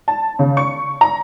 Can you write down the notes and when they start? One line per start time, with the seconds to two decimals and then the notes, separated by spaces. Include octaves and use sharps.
0.08 A5
0.39 C#3
0.57 C#6
1.01 A#5